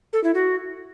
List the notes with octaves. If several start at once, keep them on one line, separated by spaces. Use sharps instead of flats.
A4
E4
F#4